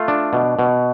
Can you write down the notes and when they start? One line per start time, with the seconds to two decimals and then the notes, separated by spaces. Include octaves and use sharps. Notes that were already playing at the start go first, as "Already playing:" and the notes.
Already playing: A3 F4
0.08 D4
0.33 B2
0.59 B2